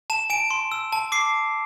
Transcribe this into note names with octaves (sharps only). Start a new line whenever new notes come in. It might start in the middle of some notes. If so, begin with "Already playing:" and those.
A5 E7
G#5 D7
C6
E6
A5
D6 C7